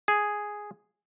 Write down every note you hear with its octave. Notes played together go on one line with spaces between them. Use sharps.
G#4